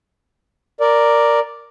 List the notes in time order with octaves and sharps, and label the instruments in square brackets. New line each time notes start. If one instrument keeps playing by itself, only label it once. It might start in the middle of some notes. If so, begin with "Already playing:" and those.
[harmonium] A#4 D5